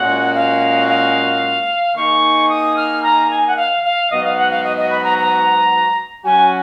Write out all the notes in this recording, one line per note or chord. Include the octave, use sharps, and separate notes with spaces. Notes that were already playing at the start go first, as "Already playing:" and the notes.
Already playing: A#2 G#3 C#4 F#4 F#5
F5
F5
D#3 A#3 D#4 G#4 C#6
D#6
F6
A#5
G#5
F#5
F5
F5
G#2 F#3 B3 F#4 D#5
F5
F#5
F5
D#5
D#5
B5
A#5
A#5
F#3 C#4 F#4 G#5